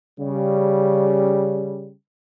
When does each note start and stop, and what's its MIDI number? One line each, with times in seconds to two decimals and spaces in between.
0.19 1.93 49
0.19 1.93 55